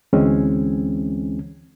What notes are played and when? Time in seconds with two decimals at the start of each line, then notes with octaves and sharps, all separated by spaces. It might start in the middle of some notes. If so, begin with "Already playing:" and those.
0.13 D2 E3 G#3 C4 C#4